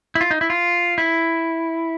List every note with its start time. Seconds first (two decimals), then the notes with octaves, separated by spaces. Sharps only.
0.15 E4
0.21 F4
0.31 D#4
0.41 E4
0.50 F4
0.98 E4